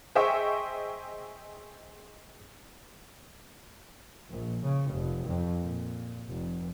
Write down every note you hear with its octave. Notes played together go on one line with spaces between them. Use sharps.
G#4 C5 D#5 E5 G5 C#6
A#1
C#3
F1
F2
A#2
F1